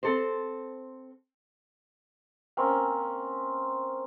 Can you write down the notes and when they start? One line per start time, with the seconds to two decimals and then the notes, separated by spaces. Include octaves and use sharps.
0.03 C4 A4 C5
2.57 A#3 C4 C#4